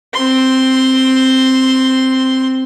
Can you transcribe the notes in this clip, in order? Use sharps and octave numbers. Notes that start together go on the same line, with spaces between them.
C4 C6